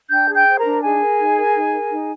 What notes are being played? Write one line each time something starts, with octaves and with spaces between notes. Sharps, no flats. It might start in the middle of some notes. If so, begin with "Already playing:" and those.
D4 G5 G6
G#4
G5 G6
C5
A#4 A#5
D4
D#4 G#4 G#5
A#4
D#4
A#4
D#4
A#4
D#4